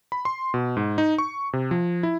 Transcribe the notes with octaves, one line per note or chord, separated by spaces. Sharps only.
B5
C6
B2
G#2
D#4
C#6
C3
F3
E4